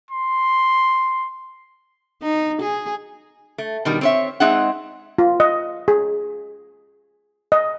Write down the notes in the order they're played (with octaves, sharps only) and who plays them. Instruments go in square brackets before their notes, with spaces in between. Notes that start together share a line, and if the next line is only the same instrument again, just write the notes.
[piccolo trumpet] C6
[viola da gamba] D#4
G#4
[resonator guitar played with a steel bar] A3
B2 D#3 G3
C4 C#5 E5
G#3 C4 D#4 G#4 E5 F#5
[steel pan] F4
D#5
G#4
D#5